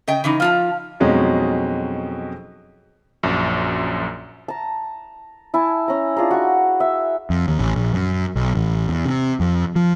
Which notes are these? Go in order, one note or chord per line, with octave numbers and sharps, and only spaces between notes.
C#3 D#5 G5
C#3 E3 D#4
F3 F4 F5 A5 F6
F2 B2 F#3 G#3 C#4 D#4
A#1 F#2
A5 A#5
E4 G#5 A5
C#4 A#5
D4 F4 G#4 A#5
F#4 C#6
E5
F2
D#2
A1
A#1
F#2
B1
A1
E2
C3
F2
F3